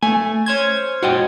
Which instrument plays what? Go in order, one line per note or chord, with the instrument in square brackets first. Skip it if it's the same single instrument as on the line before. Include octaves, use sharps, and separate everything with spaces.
[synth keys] A3 [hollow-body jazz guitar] G#5
[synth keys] C#4 C5 G#6
[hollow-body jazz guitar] F#4 D#5 G5